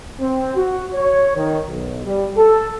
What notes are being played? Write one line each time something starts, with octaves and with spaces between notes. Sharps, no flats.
C4
F#4
C#5
D#3
B1
G3
A4